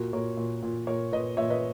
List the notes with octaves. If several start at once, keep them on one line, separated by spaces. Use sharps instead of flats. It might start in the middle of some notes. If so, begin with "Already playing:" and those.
Already playing: A#2 F#4 A#4
A#2 A#4 C#5
A#2
A#2
A#2 A#4 C#5
A#2 B4 D#5
A#2 C#5 E5
B4 D#5